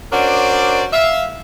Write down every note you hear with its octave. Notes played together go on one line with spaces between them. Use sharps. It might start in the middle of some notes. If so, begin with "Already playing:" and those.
C#4 D4 F#4 A#4 C5 D5
E5 F5